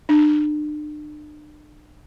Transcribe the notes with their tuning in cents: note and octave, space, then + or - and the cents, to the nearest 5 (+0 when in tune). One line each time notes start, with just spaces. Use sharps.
D4 +40